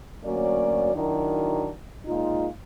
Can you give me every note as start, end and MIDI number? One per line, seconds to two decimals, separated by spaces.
0.25 0.94 38
0.25 0.94 54
0.25 0.94 58
0.25 0.94 61
0.25 0.94 74
0.95 1.70 51
0.95 1.70 54
0.95 1.70 62
0.95 1.70 64
0.95 1.70 66
0.95 1.70 70
2.06 2.47 46
2.06 2.47 56
2.06 2.47 63
2.06 2.47 65